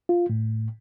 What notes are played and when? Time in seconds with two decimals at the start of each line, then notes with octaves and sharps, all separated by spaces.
0.09 F4
0.30 A2